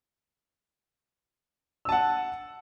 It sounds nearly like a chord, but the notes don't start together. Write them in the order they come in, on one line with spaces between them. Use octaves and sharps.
E6 A5 F#5